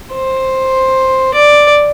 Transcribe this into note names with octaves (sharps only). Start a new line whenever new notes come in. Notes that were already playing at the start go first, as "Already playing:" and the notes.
C5
D5